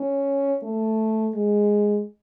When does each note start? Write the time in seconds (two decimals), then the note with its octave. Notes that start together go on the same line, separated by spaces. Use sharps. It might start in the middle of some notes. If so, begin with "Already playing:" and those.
Already playing: C#4
0.63 A3
1.35 G#3